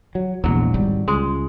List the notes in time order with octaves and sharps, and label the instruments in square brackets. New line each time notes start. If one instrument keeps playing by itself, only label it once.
[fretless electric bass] F#3
[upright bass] A#1 G#3 [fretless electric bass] E2 [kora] F#3
[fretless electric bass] G#1 [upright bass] G3
[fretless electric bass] C#2 [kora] G#3